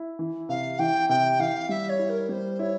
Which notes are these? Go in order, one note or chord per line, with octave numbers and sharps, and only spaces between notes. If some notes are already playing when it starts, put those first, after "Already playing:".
Already playing: E4
E3
C3 F5
E3 G5
C3 G5
E3 F5
G3 E5
C#5
E4
A#4
G3 C5 C#5
E4 C#5